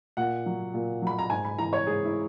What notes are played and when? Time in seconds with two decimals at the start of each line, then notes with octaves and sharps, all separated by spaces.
0.17 A#2 F#5
0.46 F#3
0.74 A#2
1.02 F#3 B5
1.19 A#5
1.30 G#2 G#5
1.45 B5
1.58 E3 A#5
1.73 C#5
1.87 G#2 G#4
2.05 E4